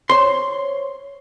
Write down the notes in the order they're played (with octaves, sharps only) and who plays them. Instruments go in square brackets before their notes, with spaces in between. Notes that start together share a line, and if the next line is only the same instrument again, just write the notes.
[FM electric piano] C5 C#5 [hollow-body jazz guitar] C6